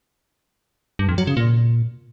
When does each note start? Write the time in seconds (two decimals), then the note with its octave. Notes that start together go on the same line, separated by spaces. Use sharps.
0.99 G2
1.09 F2
1.18 F#3
1.27 C#3
1.37 A#2